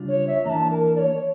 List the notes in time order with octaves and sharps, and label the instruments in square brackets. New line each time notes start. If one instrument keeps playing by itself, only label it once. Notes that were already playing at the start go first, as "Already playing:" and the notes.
Already playing: [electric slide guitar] C#3 G3 D4 F4
[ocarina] C#5
E5
[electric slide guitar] E3 A#3 D4 [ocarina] A5 A#5
[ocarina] A#4
D5
C#5